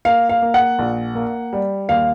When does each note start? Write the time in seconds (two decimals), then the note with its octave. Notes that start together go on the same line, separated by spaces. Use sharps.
0.05 A#3 F5
0.29 F5
0.42 A#3
0.54 F#5
0.79 A#1
1.15 A#3
1.53 G3
1.89 D#2 F5